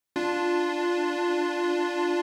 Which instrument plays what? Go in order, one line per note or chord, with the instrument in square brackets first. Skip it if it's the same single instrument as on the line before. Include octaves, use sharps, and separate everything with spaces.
[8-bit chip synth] D4 F4